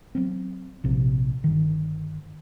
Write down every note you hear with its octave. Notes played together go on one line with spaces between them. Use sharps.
F#3 B3 C4
A#1 C3
G1 D#3